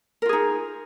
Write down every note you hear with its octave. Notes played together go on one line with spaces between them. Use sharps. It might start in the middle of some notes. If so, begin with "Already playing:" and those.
D#4 F4 G#4 A#4